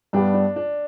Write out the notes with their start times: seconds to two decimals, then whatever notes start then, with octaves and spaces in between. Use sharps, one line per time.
0.13 G2 G3 B3 D4 G4
0.34 D4
0.56 D4